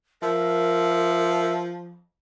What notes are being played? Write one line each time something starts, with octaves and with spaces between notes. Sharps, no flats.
F3 A#4 E5